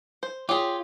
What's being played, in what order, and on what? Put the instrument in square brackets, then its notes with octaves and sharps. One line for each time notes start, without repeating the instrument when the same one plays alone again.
[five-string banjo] C5
[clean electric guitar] F4 [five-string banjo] G4 G#4 [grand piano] C#5